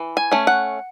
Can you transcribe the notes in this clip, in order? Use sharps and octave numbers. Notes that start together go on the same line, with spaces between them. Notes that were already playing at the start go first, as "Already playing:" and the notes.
Already playing: E3
G#5
A3 C#4
F#5